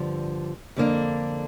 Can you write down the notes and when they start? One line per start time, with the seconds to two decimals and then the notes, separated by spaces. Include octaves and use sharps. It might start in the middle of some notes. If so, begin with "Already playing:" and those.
Already playing: G2 D3 F3
0.76 F2 D3 A#3 D4